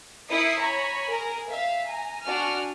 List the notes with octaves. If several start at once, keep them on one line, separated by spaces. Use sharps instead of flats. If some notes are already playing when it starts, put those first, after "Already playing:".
E4 A#4 E5 D#6 C7 C#7
C#5 G#5 A#5 B5
G#4 A#4
E5 F5
G#5 A#5
D4 F#4 G#5 F6